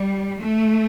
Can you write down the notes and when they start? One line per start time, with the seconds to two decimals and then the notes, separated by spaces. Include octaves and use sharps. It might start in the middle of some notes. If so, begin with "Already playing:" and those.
Already playing: G3
0.39 A3